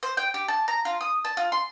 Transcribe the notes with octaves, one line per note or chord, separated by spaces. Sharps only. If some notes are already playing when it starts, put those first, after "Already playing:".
C5
G5
G4
A5
A#5
F4
D#6
A5
F4
C6